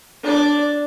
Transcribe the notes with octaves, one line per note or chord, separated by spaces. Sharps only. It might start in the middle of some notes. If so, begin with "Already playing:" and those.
D4 D5